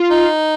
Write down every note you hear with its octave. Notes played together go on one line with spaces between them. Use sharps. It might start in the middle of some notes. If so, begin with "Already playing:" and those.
Already playing: F4
D#4